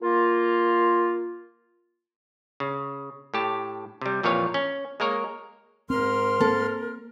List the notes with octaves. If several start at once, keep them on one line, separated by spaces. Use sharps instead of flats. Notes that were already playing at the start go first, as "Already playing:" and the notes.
A#3 F4
C#3
A2 G4 A5
C3 G3
F2 A#2 E3 F3 C#5 F5
C#4
G#3 A#3 A#4 C#5
G#2 C4 A#4 C6 F6
A#3 C4 A4